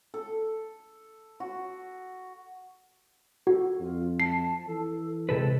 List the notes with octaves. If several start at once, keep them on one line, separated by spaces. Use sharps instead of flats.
A4
F#4
F#4 A4
F2 F4
A5 C7
E3 A4
C3 G#3 A4 B4